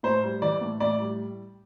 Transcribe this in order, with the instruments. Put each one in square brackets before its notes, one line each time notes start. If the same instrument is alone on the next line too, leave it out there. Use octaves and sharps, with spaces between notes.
[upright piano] A2 C5
G3
E3 D5
A2
A2 D5
G3